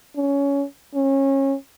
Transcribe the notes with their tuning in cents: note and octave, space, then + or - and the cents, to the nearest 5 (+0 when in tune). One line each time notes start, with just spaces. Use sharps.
C#4 +15
C#4 -25